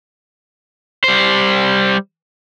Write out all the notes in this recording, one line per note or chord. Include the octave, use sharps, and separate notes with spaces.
G3 C5